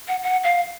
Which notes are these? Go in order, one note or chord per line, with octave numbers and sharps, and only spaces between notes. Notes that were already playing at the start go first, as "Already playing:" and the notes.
F#5
F#5
F5